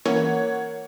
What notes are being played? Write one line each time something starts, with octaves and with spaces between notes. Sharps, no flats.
E3 A#3 C#4 E4 C#5 F#5